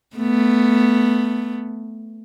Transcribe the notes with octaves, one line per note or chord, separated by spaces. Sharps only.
A3 B3